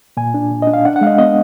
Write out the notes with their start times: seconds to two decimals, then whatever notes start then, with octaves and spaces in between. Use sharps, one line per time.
0.17 A#2 G#5
0.34 D4
0.51 A#2
0.62 D4 D#5
0.73 F5
0.85 D4 F#5
0.96 F#5
1.01 G#3 F5
1.07 D#5
1.18 B3 D#5